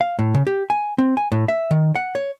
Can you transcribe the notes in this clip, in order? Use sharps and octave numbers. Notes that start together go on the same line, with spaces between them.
F5
A2
C#3
G4
G#5
C4
G#5
A2
E5
D#3
F#5
C#5